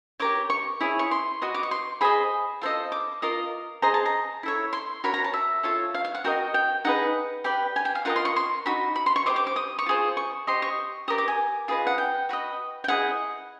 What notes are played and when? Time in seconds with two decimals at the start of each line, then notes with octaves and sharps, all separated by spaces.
0.20 G4 A#4 C#5 D6
0.50 C#6
0.81 E4 G#4 C#5
0.99 C#6
1.11 C6
1.42 F#4 B4 D#5
1.54 D6
1.63 C#6
1.71 C6
2.01 G#4 C5 D#5 B5
2.62 F4 A4 C5 D#5
2.92 D6
3.22 F4 A#4 D#5
3.82 G#4 C5 D#5 A#5
3.94 A5
4.06 A#5
4.43 E4 A4 C#5
4.73 C6
5.04 F#4 A#4 C#5 B5
5.14 A#5
5.24 A5
5.34 E5
5.63 F4 A4 C#5
5.95 F5
6.05 F5
6.15 F#5
6.24 F#4 A#4 D#5 G5
6.54 G5
6.85 D#4 G#4 B4 F#5
7.44 G4 B4 D5 G5
7.76 G#5
7.85 G5
7.95 F5
8.05 F4 A#4 D#5 F#5
8.16 C6
8.25 C#6
8.36 C6
8.66 D#4 F#4 B5
8.96 B5
9.06 C6
9.16 C#6
9.26 G4 C5 D#5 D6
9.36 D6
9.47 D6
9.56 D#6
9.79 C#6
9.86 F4 G#4 C5
10.17 C#6
10.47 G4 C5 D#5 C6
10.62 C#6
11.08 G4 A#4 D5 D#6
11.18 D6
11.28 G#5
11.68 F4 G#4 B4 D#5
11.87 F#5
11.98 G5
12.29 F#4 B4 D#5
12.84 G5
12.88 E4 G#4 C5 D#5 F#5